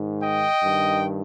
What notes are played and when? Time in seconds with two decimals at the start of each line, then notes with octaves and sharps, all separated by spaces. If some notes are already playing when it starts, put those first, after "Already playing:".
Already playing: G#2 D#3
0.22 D#5 G5
0.62 G2 D#3